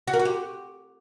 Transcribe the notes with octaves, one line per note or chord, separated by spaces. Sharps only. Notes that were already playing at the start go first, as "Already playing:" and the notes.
F#4
A#4
F#4
G4